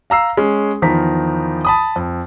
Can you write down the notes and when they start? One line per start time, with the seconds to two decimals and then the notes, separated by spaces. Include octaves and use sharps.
0.10 F5 A#5 E6 C7
0.37 G#3 C#4
0.82 E2 D#3 F3 A#5 B6
1.65 A5 B5 D#6
1.96 F2